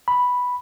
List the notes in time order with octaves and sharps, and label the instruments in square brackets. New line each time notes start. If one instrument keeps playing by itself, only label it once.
[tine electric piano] B5